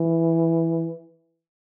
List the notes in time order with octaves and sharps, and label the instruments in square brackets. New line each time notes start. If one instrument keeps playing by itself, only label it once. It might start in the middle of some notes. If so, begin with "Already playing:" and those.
Already playing: [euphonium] E3